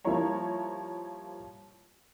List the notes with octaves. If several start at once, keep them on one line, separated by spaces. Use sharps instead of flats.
F3 G3 A#3 E4 C#5 A#5